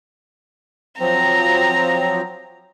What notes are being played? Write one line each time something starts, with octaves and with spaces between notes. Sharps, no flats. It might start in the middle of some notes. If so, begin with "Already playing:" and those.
F3 F#3 C4 A#5